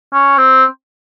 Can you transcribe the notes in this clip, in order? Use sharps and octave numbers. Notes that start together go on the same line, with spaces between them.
C#4
C4